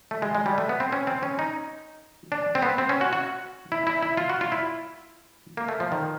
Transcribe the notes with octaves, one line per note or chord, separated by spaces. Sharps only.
A3
G#3
G#3
G3
A3
B3
C4
C#4
C4
C#4
D#4
D4
C4
B3
C4
C#4
F#4
F#4
E4
E4
E4
F4
F#4
F4
E4
A#3
A3
F3
D#3